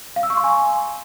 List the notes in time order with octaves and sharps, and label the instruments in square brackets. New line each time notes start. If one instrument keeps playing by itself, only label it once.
[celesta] F5
E6
C#6
C6
G#5